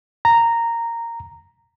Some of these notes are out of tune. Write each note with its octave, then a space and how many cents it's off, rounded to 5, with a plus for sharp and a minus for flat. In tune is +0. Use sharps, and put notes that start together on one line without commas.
A#5 -10